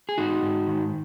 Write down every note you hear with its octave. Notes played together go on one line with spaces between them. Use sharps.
G#4
G#2 D#4 F#4
G#2
D#3